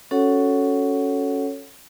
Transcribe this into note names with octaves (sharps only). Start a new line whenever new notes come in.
C#4 F#4 A4 C#5 F#5